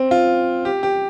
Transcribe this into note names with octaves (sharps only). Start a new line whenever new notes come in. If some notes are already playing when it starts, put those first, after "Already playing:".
Already playing: C4
F4
G4
G4